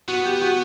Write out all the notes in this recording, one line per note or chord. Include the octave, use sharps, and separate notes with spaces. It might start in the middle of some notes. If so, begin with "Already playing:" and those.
B3 F#4
G4
F#4